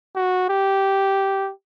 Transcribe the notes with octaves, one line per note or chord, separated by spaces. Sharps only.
F#4
G4